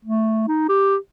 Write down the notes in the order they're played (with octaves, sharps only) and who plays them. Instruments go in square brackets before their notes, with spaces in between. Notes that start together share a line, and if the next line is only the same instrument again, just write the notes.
[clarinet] A3
D#4
G4